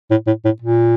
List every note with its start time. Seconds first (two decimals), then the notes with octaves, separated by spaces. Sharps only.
0.11 A2
0.27 A2
0.45 A2
0.62 A#2